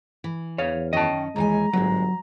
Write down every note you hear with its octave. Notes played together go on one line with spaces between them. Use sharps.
E3
E2 C#5 F5
F#2 D#3 C#4 D#5 G5 A5
D#2 E3 G#3 G#5 A#5
G1 G#2 F#3 G#3